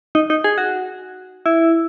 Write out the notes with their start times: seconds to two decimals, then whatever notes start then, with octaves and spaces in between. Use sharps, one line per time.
0.15 D#4
0.30 D#4
0.44 G#4
0.58 F#4
1.46 E4